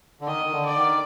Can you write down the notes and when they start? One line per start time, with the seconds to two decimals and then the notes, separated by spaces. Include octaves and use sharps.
0.21 D3
0.27 D#3 D#5
0.46 D#3
0.52 D3
0.65 D5
0.77 D#3